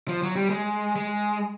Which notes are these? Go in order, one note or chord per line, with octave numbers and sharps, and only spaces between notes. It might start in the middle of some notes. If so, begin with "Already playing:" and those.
F3
F#3
G3
G#3
G#3